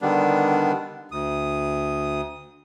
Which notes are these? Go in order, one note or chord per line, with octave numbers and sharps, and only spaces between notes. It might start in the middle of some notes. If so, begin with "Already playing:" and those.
D3 D#3 G3 B3 D4
D2 D#6